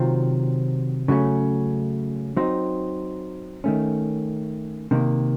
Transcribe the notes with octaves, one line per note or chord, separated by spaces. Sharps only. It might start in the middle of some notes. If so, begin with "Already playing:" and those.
Already playing: C3 D#3 F#3 C4 F4
C#3 F#3 A3 C#4
F#3 C4 D#4
D#3 A3 C#4
C3 D#3 A#3